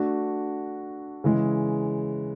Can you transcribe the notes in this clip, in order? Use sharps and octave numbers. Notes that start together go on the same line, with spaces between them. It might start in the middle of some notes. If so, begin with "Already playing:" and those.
Already playing: A3 D4 F#4
C#3 E3 G#3